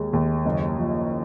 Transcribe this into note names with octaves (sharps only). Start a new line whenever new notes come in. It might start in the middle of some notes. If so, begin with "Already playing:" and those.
Already playing: D#2 G#3
D#2
F#1
F3